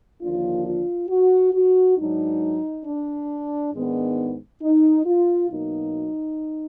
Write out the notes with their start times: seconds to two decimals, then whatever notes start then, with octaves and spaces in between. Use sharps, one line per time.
0.21 D#2 D3 F3 A#3 D4 F4
0.65 F4
1.09 F#4
1.53 F#4
1.96 G#2 F#3 D4 D#4
2.85 D4
3.73 G#2 D#3 G#3 B3 D4
4.61 D#4
5.05 F4
5.49 B2 F#3 A#3 D#4